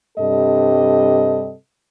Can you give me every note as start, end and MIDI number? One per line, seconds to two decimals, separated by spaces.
0.18 1.54 43
0.18 1.54 48
0.18 1.54 55
0.18 1.54 69
0.18 1.54 75